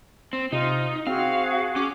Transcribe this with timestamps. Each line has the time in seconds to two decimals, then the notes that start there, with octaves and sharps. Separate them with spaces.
0.33 C4
0.52 C3 D#4 F4
1.07 C4 F#4 G#4 F5
1.76 C#4 D6